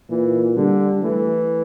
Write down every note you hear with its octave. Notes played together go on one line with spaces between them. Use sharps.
A#2 E3
D3 G3
E3 A3